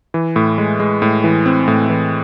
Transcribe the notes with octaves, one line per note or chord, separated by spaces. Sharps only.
E3
A2
G#3
G#3
A2
E3
C4
A2
E3